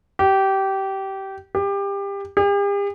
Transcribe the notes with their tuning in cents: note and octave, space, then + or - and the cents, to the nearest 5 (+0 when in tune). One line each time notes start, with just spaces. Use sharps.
G4 -20
G4 +25
G4 +45